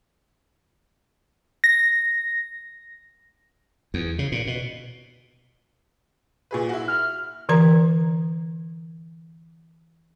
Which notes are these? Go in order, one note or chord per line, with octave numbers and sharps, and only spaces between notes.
A#6
E2
C#3
A#2
B2
A#2 G#4 B4
E4 F#4
F6
D3 E3 A#4 A#5